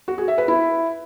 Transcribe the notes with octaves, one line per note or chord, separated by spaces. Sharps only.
F#4
G#4
E5
B4
E4